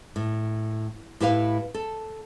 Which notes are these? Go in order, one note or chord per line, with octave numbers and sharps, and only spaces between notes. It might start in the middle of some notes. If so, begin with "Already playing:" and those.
A2
A2 E4 G4 B4 C#5 F5
A4